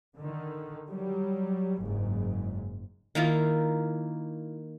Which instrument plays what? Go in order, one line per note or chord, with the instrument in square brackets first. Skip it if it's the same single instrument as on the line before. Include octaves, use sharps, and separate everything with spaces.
[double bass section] D3 D#3
F#3 G3
F#1 G#2
[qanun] D#3 A#3 E4 F4